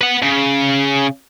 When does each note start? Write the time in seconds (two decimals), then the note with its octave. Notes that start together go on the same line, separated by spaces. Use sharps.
0.01 B4 F#5
0.22 C#3